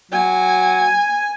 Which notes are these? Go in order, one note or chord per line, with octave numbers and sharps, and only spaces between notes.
F#3 G#5